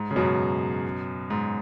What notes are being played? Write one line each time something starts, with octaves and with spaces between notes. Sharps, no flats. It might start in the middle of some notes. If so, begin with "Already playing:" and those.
Already playing: G#2
C#3
F#2 B2
G#2